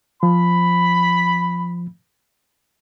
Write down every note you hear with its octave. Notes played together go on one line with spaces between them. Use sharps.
F3 B5